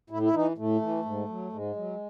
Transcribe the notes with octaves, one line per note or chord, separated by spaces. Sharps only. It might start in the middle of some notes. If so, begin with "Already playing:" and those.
A2 E4
E4
E3 D#4
A2 A3
E3
G#2
F#3
G#2 G#3
F#3